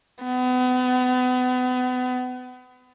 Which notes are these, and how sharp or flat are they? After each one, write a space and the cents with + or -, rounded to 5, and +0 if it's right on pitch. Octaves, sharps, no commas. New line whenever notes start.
B3 +35